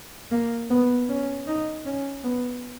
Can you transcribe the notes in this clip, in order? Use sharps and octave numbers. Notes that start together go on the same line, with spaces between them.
A#3
B3
C#4
D#4
C#4
B3